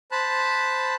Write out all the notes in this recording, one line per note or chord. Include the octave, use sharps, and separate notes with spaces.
C5 A5 B5 F#6